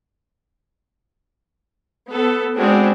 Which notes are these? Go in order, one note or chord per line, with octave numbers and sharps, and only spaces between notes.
B3 A4
G#3 B3 C4 D4 F#4 G#4